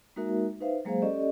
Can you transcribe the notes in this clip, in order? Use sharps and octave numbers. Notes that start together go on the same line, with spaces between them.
G#3 A#3 D#4 F#4 A#4 E5
D#4 B4 C5 E5 F5
F#3 G#3 A#3 G#4 C5 F5
C#4 G4 A4 D5 D#5